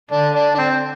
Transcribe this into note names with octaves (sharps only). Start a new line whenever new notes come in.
D3 D4
D4
D4
C4